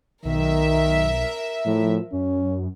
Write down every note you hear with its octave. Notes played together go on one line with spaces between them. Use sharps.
B1 D#3 A#4 E5
A2 F3
F#2 C#4